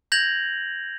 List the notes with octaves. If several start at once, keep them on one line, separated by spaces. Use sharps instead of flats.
G6 G#6 A#6 F7 F#7